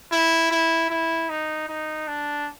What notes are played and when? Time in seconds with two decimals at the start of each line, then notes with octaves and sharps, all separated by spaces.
0.12 E4
0.51 E4
0.90 E4
1.29 D#4
1.68 D#4
2.08 D4